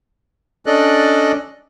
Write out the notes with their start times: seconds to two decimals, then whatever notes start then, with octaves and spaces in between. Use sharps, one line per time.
0.66 C#4 D4 A4 D5 D#5 F#6